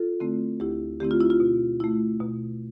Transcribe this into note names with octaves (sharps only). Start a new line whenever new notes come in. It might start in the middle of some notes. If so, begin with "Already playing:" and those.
Already playing: F4 A4
D3 A3 C4 E4
D2 E4 G4
D3 A3 C4 E4 G4
F4
E4
F4
B2
A3 E4
B2